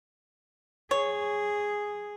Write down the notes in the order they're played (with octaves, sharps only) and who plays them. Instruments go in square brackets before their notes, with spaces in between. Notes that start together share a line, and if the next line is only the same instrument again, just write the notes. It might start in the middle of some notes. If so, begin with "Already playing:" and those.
[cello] G#4 [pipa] C#5